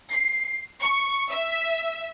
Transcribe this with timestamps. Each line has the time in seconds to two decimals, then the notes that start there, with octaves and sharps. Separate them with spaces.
0.13 C7
0.82 C#6
1.32 E5